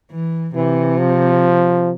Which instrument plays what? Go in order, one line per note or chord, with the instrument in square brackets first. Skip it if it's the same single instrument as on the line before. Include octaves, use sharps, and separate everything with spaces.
[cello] E3
[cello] C3 [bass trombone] E3
[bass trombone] F3